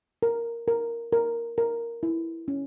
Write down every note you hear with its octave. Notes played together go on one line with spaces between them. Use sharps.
A#4
A#4
A#4
A#4
E4
C#4